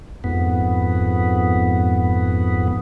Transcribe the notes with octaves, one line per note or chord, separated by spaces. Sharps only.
F2 G#2 B3